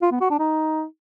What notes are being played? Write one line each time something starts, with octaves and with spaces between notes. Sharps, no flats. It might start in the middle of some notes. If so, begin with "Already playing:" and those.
F4
B3
F#4
D4
D#4